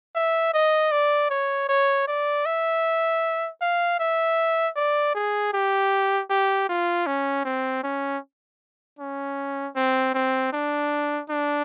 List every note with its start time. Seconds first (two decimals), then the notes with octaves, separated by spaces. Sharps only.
0.15 E5
0.54 D#5
0.92 D5
1.30 C#5
1.69 C#5
2.08 D5
2.45 E5
3.61 F5
3.99 E5
4.76 D5
5.14 G#4
5.53 G4
6.30 G4
6.69 F4
7.07 C#4
7.45 C4
7.84 C#4
8.99 C#4
9.76 C4
10.14 C4
10.53 D4
11.30 D4